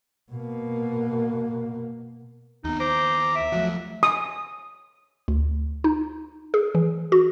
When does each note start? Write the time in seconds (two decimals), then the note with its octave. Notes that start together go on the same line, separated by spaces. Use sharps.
0.32 B2 A#3
2.64 D#2 B3 D#4
2.80 C5 A#5 D6
3.35 E5
3.52 F3 F#3 A3
4.03 D#6
5.28 D2
5.84 D#4
6.54 G#4
6.75 E3
7.12 F#4